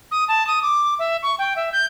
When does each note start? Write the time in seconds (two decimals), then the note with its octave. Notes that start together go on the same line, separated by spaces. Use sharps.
0.11 D#6
0.28 A5
0.47 D#6
0.62 D6
0.99 E5
1.23 C#6
1.39 G5
1.56 E5
1.72 G6